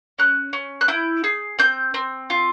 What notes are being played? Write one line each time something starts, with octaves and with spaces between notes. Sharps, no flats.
C#4 F#6
C#4
F#6
E4 G6
G#4
C4 G6
C4
F4